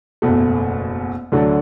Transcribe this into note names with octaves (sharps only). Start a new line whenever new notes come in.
F#1 E2 B2 A3
D2 D3 F#3 A3 D4